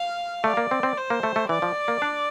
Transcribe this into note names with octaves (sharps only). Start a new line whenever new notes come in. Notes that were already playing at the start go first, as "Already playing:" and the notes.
Already playing: F5
A3 D5
A#3
C4
C4
C5
A#3
A3
A3
E3 D5
F3
A#3
D4